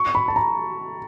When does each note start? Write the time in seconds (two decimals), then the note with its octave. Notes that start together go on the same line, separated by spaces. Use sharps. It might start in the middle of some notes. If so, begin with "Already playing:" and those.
Already playing: C#6
0.15 B5
0.28 A5
0.36 A#5